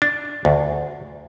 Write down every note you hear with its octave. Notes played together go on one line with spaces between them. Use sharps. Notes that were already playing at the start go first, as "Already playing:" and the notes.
D4
D2